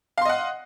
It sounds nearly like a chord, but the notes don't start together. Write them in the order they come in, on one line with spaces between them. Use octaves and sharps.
F5 C6 D#5 F#5